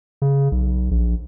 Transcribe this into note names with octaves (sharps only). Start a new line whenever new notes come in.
C#3
B1
A#1